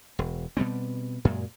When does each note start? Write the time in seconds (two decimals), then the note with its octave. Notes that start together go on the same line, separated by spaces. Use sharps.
0.19 E1
0.57 B2 G3 B3 C4
1.25 F#2 A#2 G#3